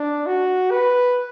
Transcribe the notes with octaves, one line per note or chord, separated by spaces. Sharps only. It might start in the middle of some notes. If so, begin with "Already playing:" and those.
Already playing: D4
F#4
B4